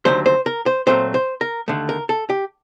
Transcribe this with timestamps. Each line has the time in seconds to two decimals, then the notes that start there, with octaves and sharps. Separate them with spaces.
0.05 D#2 D3 F#3 A3 C5
0.26 C5
0.46 A#4
0.66 C5
0.87 A#2 F#3 A3 C4 C5
1.14 C5
1.41 A#4
1.68 D#2 D3 A3
1.89 A#4
2.09 A4
2.30 G4